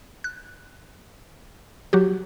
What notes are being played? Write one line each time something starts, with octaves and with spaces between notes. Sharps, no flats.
F#6
F#3 F#4 G4